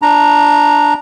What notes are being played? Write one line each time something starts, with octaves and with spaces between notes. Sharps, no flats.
D4 A#5